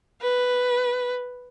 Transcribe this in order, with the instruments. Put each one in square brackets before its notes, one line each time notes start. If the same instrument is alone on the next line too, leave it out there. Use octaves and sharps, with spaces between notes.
[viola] B4